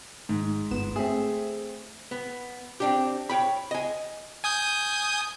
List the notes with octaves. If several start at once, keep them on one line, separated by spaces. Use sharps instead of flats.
G#1 G#2
G1 B3 E7
A3 C4 G#4 E5
B3
C4 D4 G4
C#5 G5 B5
D#5 G#5
G#5 D#6 G6